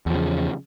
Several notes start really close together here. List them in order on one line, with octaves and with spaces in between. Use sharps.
E2 F3 C#3